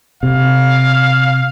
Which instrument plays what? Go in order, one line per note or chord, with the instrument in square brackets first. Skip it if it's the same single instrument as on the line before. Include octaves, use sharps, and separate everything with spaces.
[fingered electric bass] C3 [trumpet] F5